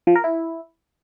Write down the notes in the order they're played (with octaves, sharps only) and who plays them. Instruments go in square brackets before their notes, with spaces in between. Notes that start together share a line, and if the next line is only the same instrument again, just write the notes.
[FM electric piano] F3
A#4
E4